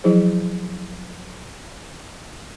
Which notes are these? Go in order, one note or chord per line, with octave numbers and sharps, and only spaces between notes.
F3 F#3 E4 G#4 C5